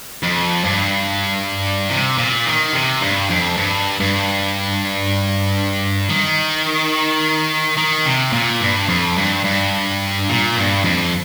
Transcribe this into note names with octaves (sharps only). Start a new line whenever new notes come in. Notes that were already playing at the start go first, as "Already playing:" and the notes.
F2
G2
C3
A#2
D#3
C3
G2
F2
G2
G2
D#3
D#3
C3
A#2
G2
F2
G2
G2
A#2
G2
F2